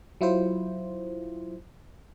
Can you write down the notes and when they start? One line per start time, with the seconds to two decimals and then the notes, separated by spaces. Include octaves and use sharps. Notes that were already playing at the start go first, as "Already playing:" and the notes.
0.21 F#3 E4 F4 C5